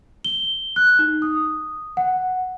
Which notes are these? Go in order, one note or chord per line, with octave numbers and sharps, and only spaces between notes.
G7
F#6
D#4
D#6
F#5